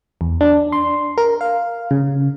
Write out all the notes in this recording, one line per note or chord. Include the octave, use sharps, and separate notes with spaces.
E2
D4
C6
A#4
F5
C#3